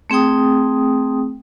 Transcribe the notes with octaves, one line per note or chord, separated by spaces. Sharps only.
A3 C4 G#4 G5 D#6